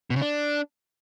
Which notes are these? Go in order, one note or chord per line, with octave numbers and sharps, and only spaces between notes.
B2
C#3
D4